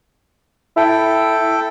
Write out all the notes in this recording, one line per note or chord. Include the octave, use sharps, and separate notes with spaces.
E4 A4 G5